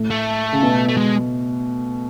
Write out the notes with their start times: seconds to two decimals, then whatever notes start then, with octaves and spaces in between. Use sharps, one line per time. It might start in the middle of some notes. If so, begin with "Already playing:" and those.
Already playing: A2
0.10 A3
0.53 C#3
0.63 B2
0.89 A3
0.97 G#3